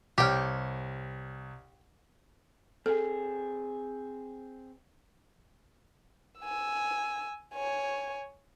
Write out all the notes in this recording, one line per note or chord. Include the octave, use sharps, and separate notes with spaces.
C2 G4 C#5 G5 F6
C4 G#4 A4
G#5 E6
C#5 G#5